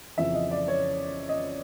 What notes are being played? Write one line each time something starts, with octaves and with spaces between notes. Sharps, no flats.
F2 C#3 E3 E5
D#5
D5
C#5
D#5